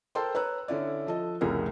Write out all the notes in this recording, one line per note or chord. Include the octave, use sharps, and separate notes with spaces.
A4 A#4 C5 G5 A5 C6
B4 C#5 A#5 E6 F#6
D3 C#4 E4 D5
F3 A4 D#5
F1 C2 A2 C#3 G#4 A#4